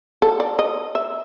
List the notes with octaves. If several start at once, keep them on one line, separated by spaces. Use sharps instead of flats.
A4
D5
D#5
E5